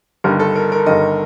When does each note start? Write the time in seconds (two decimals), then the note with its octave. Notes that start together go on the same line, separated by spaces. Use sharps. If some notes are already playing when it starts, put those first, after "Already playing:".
0.24 G1 G2 D#3 A#4
0.40 A4
0.55 A#4
0.72 A#4
0.86 G1 G2 D#3 D#5